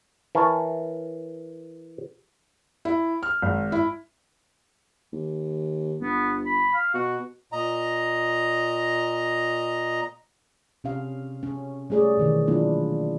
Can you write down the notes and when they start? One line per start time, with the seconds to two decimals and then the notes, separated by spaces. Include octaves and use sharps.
0.35 E3 A#4 C#5 A5
2.85 E4
3.23 F6
3.42 G#1
3.72 E4
5.13 D#2
6.01 G1 B3
6.46 B5
6.74 F5
6.94 B2 F#4
7.52 A#2 D#5 A#5
10.84 C3 C#4 F5
11.43 C#4
11.90 G3 A3 G#4 C#5 D5
12.17 B2 D#3 E3
12.47 F#3 A#3 D4 E4 F4